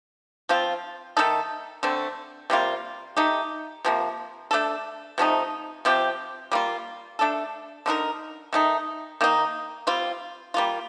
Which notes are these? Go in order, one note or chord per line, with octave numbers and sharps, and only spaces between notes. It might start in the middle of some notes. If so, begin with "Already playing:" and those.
F3 C4 F4
D#3 A3 D#4 A4
D3 A3 C4
C3 G3 A#3 F4
A3 D#4 G4
C3 F3 A#3
A3 D4 A4
C3 F3 A3 D#4
C3 F3 C4 G4
G3 A#3 F4
A3 D4 A4
D3 A3 D#4 A#4
D#3 A3 D#4
D#3 A#3 D#4
G3 C4 F4
G3 A#3 F4